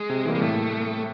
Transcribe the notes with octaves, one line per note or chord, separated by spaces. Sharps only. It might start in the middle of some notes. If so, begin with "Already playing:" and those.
Already playing: G#3
C3
E3 G3 A#3
G#3
A2 A3